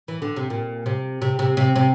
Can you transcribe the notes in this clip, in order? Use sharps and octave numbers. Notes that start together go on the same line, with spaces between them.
E3
D3
C3
A#2
C3
C3
C3
C3
C3